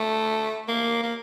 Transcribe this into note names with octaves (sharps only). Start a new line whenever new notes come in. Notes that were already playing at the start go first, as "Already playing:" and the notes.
Already playing: A3
A#3
A#3